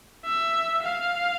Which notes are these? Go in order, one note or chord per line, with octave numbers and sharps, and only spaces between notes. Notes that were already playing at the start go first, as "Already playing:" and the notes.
E5
F5